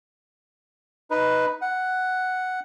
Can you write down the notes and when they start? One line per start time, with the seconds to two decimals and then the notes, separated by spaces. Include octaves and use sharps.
1.11 D#4 B4
1.62 F#5